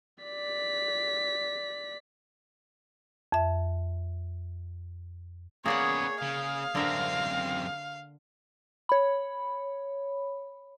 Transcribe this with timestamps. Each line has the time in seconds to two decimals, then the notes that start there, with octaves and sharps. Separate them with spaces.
0.24 D5 B6
3.32 F2 E5
5.66 C#3 A#3 B3 G#4 C#5 D5 F#5
6.22 C#3 F5
6.75 F#2 D3 C4 A#4 E5
8.89 C#5 B5